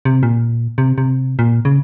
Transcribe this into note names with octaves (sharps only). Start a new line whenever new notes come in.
C3
A#2
C3
C3
A#2
C#3